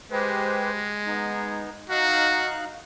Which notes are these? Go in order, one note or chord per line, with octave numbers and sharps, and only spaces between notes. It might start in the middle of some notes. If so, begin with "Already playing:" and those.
G#3 G4 B4 C5
B3 D#4
D#4 F#4 F5 F#6